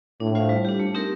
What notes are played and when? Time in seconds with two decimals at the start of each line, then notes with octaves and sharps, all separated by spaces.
0.20 A2 D4
0.35 F4 C5 F5
0.49 G3
0.65 D4 G4
0.80 A3
0.94 C4 D#4 G4 A#4